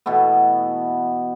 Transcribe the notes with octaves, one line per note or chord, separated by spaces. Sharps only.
B2 E3 A3 B3